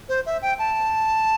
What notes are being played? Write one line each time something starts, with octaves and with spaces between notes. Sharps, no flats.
C5
E5
G5
A5